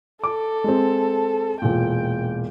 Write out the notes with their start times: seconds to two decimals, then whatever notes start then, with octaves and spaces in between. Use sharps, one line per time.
0.24 A4 D6
0.64 G#3 C4
1.62 E1 A#2 G5